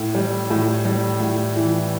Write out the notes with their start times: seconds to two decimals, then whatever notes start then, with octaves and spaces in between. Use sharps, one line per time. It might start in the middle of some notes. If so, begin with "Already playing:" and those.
Already playing: A2
0.15 G3
0.50 A2
0.85 G3
1.20 A2
1.56 E3